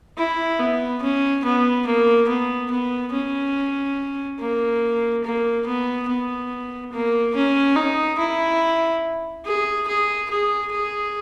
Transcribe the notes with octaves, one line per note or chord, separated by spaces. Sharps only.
E4
B3
C#4
B3
A#3
B3
B3
C#4
A#3
A#3
B3
B3
A#3
C#4
D#4
E4
G#4
G#4
G#4
G#4